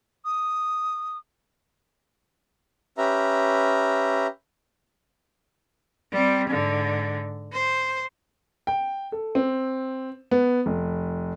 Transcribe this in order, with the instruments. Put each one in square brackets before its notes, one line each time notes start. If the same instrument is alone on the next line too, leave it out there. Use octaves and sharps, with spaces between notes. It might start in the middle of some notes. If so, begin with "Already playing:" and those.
[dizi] D#6
[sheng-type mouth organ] C#4 G4 B4 E5 A#5
[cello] G3 C4
G#2 D3
C5
[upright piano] G5
A4
C4
B3
F1